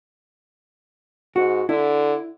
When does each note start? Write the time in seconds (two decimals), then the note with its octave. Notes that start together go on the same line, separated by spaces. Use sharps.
1.36 G#2 F#4
1.69 D3 E4